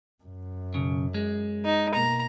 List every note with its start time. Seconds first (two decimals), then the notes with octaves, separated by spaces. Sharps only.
0.24 F#2
0.74 B1 C#3
1.14 G#3
1.65 D#4
1.94 B2 A#3 A#5